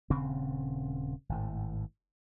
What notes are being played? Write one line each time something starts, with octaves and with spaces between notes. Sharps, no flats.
D#1 C#3 C4
G#1 A2